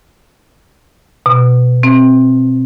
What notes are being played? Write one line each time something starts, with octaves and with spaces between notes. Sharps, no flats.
B2
C4